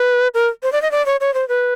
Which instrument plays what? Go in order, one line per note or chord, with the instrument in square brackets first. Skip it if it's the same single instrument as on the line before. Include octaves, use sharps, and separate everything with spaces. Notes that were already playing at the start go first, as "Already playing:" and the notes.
Already playing: [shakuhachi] B4
A#4
C5
D5
D#5
D5
C#5
C#5
C5
B4